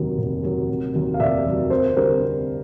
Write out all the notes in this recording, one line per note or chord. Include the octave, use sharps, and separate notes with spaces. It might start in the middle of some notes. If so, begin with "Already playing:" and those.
Already playing: F1 D#2 D#3 F#3
F1
D#2 D#3 F#3
F1
D#2 D#3 F#3
F5
F1 D5 E5
D#2 D#3 F#3
G#1 A#4 C5
D3 G3 A#4 C5